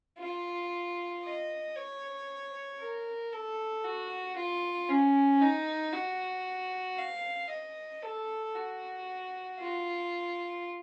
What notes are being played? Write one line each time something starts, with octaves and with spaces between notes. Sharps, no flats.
F4
D#5
C#5
A#4
A4
F#4
F4
C#4
D#4
F#4
F5
D#5
A4
F#4
F4